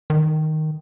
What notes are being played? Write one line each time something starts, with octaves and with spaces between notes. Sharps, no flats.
D#3